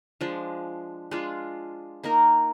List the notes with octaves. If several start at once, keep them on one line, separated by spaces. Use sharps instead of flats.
F3 G#3 D4
G#3 D4 F4
A#3 D#4 A#4